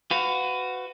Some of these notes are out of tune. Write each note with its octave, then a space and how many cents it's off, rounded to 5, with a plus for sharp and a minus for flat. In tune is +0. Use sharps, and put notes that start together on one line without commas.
F#4 +0 B4 +30 F5 +0